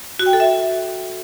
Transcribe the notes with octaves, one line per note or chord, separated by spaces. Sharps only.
F#4
G5
A4
E5